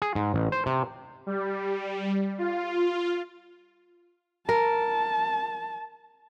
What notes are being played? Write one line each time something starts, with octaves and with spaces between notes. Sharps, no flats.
G#4
G#2
A1
C5
C3
G3
F4
A#4 A5